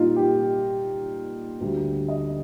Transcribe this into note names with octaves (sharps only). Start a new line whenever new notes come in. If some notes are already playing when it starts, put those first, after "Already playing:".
Already playing: A#2 G3 A#3 D#4 F4
G4
D2 D3 G3
D#5